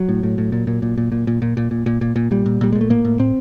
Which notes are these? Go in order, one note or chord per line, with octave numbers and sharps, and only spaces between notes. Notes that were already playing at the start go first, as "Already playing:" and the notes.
Already playing: F#3
A2
A2
A2
A#2
A#2
A#2
A#2
A#2
A#2
A#2
A#2
A#2
A#2
A#2
A#2
A#2 G3
A#2
A#2 G3
A#2 G#3
A3
A2 A#3
A2
A2 C4